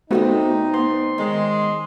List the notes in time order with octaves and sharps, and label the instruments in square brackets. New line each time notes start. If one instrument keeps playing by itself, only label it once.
[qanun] C3 G3 C4 [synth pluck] A3 B3 F#4 [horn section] D#4
[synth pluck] B3 [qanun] D5 [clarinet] C6
[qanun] D#3 C#5 [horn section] G#3